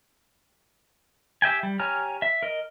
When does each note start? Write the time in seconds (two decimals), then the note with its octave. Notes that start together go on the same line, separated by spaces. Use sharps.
1.42 G4 E5 G5 G#5
1.63 G3
1.80 G4 C#5 G#5 A#5 F6
2.22 E5
2.43 A#4 D#5